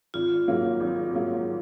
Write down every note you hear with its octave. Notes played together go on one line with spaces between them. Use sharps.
G#1 F4
G#2 F#3 A#3
G#1
G#2 F#3 A#3